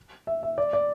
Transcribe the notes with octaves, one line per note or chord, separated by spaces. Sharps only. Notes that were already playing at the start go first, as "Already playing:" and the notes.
E5
E5
D5
D5